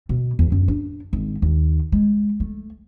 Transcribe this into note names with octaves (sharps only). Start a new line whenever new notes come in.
B2
E2
F#2
D4
G#1
D#2
G#3
A3